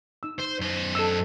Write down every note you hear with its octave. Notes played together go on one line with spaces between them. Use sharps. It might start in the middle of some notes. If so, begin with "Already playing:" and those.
D#4 E6
C5
F#2 C5
A4 D#5 E6